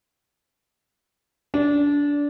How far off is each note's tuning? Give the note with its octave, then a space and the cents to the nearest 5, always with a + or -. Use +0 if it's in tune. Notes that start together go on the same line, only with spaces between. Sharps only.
D4 -20